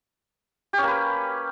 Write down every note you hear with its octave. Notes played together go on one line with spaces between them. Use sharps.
A#3 C#4 G4 B4